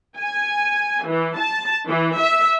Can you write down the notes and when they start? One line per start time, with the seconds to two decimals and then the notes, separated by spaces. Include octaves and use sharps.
0.19 G#5
1.07 E3
1.38 A5
1.88 E3
2.19 E5